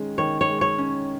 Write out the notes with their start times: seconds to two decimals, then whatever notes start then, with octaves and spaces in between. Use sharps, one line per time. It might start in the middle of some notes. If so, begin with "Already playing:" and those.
Already playing: D#3 G#3 C#4
0.18 D#3 C#5
0.41 C#5
0.49 G#3
0.61 C#5
0.78 C#4